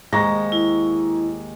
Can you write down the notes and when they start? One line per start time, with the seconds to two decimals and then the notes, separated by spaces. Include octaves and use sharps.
0.13 D#2 G#3 C5 A#5 C#6 A#6
0.52 E4